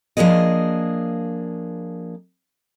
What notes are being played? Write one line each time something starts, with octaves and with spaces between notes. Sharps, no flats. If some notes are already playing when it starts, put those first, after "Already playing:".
F3 A#3 D4 G#4 D#5